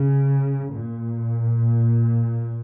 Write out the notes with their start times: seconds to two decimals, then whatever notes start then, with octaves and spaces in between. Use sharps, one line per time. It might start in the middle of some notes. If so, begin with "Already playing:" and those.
Already playing: C#3
0.71 A#2